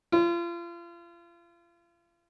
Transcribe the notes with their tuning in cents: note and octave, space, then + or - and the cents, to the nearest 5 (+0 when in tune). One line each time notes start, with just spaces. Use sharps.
F4 -35